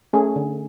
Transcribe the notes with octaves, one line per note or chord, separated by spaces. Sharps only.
A3 C#4 G#4
D3